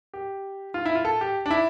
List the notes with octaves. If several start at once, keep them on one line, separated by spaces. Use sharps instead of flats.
G4
F4
E4
F4
A4
G4
D4
E4